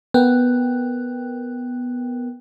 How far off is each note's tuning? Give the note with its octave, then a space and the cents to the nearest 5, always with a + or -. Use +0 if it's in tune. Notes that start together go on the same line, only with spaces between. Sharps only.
B3 +0 A#4 +0 G5 +0